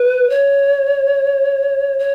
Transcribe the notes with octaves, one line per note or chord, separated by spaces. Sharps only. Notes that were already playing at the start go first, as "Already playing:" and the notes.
Already playing: B4
C#5
C#5